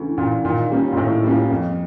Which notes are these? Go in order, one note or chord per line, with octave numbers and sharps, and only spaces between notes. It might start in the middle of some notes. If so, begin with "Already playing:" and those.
Already playing: D2 C#3 E3
A#2 C#3 E3
A#2 D#3
G3 A#3 C#4 F4
A#2
A2 D#3
G3 A#3 C#4 F4
F2